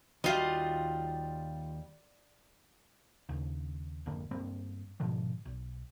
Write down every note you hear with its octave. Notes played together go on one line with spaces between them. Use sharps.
D#2 G3 F4 F#4 D#5 E5
D#2 C#3
G#1 F2 D3 A#3
G1 G2 A#3 C4
G#2 B2 D3 F3
B1